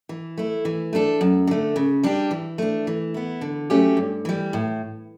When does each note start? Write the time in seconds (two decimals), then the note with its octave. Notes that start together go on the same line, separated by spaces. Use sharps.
0.09 E3
0.38 A3 E4
0.65 E3
0.93 A3 D4 A4
1.21 F#2
1.47 D3 A3
1.76 C#3
2.03 G3 D4 G4
2.31 E3
2.58 A3 D4
2.87 E3
3.14 B3 E4
3.41 D3
3.70 F#3 A3 C#4 G4
3.97 G2
4.25 E3 G3
4.53 A2